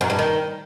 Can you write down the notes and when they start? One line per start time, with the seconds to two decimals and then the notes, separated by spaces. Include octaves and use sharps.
0.01 F#2
0.10 G2
0.19 D#3